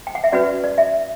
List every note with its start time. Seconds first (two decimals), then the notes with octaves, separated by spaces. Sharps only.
0.07 G5
0.15 F#5
0.24 E5
0.32 C#4 F#4 B4 D5
0.64 D5
0.78 E5